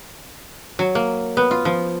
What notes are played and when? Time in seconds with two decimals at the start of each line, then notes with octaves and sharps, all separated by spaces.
0.79 F#3
0.95 A#3
1.37 B3
1.51 F4
1.65 F3